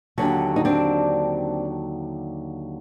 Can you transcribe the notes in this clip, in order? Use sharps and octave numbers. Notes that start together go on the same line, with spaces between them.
D#2 D3 F#3 C#4
D#4
C4 D4